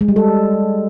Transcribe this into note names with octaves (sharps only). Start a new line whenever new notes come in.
G#3
G3
A4